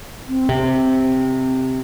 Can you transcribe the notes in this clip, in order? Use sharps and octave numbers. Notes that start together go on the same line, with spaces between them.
C4
C3